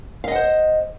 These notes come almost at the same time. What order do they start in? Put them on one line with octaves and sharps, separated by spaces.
F5 D#5 F#5 C5